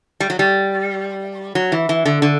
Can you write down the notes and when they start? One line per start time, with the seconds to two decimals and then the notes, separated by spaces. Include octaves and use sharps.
0.20 G3
0.30 F#3
0.39 G3
1.55 F#3
1.72 E3
1.89 E3
2.05 D3
2.22 D3